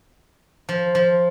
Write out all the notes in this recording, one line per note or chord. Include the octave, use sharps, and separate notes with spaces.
F3
F3